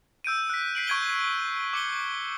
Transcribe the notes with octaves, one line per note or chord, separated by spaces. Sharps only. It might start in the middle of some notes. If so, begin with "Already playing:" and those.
E6 G6 D7 D#7
F#6 B6
B6 C7 D7 F#7
C#6 G6 G#6 D7 D#7 G7
D6 C#7 G7